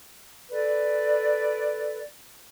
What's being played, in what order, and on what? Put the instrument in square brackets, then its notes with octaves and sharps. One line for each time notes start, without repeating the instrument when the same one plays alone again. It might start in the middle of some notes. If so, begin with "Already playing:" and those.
[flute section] A4 B4 D5